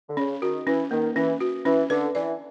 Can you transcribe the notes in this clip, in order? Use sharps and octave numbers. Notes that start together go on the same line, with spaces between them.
D3
C#3 C#4
D#3 F#4
E3 C#4
D#3 A#3
E3 C#4
F#4
E3 C#4
D3 B4
E3 D5